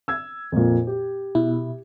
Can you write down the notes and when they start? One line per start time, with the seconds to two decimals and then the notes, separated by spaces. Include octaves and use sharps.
0.08 E6 G#6
0.52 F2 A#2
0.87 G4
1.35 B2 E4